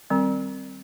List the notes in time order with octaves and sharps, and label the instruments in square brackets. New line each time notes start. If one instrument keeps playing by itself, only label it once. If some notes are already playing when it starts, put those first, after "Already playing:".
[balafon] D#3 G3 C4